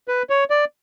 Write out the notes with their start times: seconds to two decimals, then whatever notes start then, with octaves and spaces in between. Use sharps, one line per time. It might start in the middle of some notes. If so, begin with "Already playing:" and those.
0.08 B4
0.30 C#5
0.50 D5